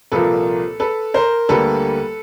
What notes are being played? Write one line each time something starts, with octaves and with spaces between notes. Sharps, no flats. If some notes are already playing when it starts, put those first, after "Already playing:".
C2 A#2 F3 A#3 A4 B4
A4 B4
A#4 C5
D2 D3 G3 A#3 A4 B4